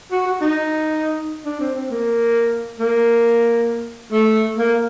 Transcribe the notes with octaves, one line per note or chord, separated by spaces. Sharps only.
F#4
F#4
D#4
D4
C4
C4
A#3
A#3
A3
A#3